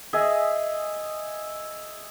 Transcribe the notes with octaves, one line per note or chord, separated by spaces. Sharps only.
G#4 D#5 E5 G#5